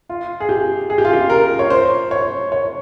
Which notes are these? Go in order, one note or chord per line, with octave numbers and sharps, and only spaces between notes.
F4
G#4
G4
G#4
G4
F4
G4
A#4
C#5
C5
C#5
C#5